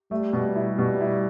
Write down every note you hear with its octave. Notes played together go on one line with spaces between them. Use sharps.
G3 A3
B2
E4
B2 G3
E4